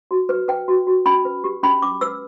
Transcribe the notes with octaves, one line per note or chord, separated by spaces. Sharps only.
F#4
B4
B4 G5
F#4
F#4
C#4 B5
B4
G4
C#4 B5
C#4 D6
B4 E6